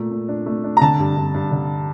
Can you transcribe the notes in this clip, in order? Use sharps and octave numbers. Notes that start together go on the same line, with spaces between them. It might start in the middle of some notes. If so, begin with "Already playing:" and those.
Already playing: A#2 A3
A#2
D4
A3
D4
A#5
D3 A5
G2
G2
G2
D3